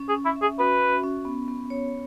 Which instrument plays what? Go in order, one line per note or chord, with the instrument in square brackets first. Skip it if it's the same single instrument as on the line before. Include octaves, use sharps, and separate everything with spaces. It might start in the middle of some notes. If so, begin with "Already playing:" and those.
Already playing: [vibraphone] C#4
[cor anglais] G#4
[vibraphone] C#4
[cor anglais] E4
[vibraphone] E5
[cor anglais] G#4
[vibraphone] F#4 [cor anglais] B4
[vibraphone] C#4
C#4
B3
B3
C#5